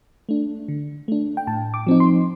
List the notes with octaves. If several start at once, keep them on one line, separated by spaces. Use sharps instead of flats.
A3 D4
D3
A3 D4
G5
A2 A5
D6
F3 C4 D#4
C6